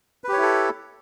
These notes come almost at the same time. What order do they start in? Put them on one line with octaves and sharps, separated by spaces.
B4 G4 C#5 E4 A4